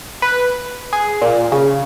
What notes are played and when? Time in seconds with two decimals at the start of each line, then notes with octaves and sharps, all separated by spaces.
0.22 B4
0.93 G#4
1.21 A#2
1.52 C#3